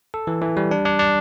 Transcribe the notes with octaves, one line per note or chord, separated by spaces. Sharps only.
A4
E3
E3
G3
D4
D4
D4